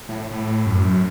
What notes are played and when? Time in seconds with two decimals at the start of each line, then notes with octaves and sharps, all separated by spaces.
0.09 A2
0.31 A2
0.66 F#2